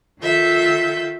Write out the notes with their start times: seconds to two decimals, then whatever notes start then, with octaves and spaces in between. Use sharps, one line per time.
0.22 D#3 F4 A4 E5 G6